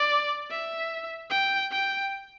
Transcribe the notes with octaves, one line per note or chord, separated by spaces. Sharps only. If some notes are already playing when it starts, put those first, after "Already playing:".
Already playing: D5
E5
G5
G5